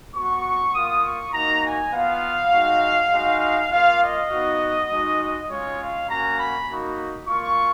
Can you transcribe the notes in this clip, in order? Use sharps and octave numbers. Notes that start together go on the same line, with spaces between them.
B3 F#4 C#6
A#3 F4 D#6
C#6
A#3 D#4 F#4 A#5
G#5
B3 F4 F5
G#3 D#4 F#4
G#3 D#4 F#4
A#3 F4 F5
D#5
B3 D#4 F#4
G#3 D#4 F#4
G#3 C#4 F4 C#5
F5
A#3 C#4 F#4 A#5
B5
A#3 D#4 F#4
A#3 F4 C#6